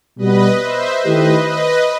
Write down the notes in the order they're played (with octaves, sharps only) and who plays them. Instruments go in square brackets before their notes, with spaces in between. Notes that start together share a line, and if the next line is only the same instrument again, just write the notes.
[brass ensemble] B2 G3 B3 [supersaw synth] B4 D#5
[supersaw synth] C5 E5
[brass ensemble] D#3 A3 E4 G4 [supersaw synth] B4 D#5
[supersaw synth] B4 D#5